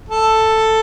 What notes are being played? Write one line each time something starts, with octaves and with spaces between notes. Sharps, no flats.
A4